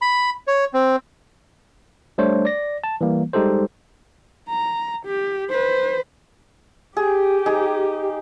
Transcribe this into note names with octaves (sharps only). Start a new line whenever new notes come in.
B5
C#5
C4
G3 A3 D4 C5 C#5
D5 A#6
A5
E3 G3 A#3
G3 G#3 D#4 G4 A4 C5
A#5
G4
B4 C5
G4 G#4
D#4 G#4